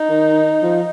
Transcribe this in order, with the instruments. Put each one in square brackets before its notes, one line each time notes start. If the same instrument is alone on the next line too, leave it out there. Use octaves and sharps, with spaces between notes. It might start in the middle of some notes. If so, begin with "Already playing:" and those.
Already playing: [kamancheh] D#4
[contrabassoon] D#3
F3